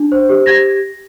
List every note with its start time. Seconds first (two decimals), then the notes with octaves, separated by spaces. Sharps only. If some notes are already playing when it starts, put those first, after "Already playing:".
Already playing: D4
0.12 C5
0.29 G4
0.46 G4 G#6 A#6